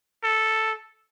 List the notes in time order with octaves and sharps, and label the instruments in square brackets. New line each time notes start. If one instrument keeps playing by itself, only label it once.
[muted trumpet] A4